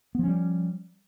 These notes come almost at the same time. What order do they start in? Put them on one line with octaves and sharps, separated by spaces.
B3 F3 C#4 G3